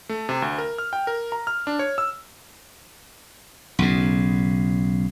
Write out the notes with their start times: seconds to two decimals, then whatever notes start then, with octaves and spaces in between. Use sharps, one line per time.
0.09 A3
0.29 C3
0.42 D2
0.58 A#4
0.78 F6
0.93 G5
1.07 A#4
1.32 A#5
1.47 F6
1.67 D4
1.79 C#5
1.98 E6
3.79 B1 C#3